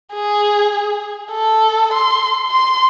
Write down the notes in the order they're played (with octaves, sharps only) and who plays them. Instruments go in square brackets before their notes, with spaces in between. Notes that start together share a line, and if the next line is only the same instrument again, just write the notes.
[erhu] G#4
A4
C6
C6